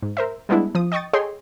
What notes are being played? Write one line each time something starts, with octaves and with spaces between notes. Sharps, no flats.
G#2
A#4 C5 E5
G3 G#3 B3 D4 E4
F3 D#6
D#5 G5 C#6 D#6 A6
G#4 A4 C#5 D#5 G5 C6